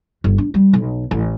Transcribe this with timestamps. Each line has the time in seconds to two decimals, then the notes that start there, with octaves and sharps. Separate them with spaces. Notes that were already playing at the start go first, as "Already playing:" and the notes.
0.24 G1
0.38 D4
0.54 G3
0.73 B1
1.11 A1